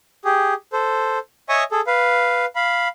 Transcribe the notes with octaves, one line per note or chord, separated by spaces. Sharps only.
G4 G#4
A4 C5
C#5 D#5 E5 G#5 C#6 D#6
G#4 A4
B4 F5
F5 B5